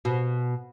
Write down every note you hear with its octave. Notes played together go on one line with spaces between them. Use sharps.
B2